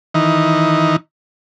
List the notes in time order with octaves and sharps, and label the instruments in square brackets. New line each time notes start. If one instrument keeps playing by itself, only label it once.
[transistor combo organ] D#3 E3 D#4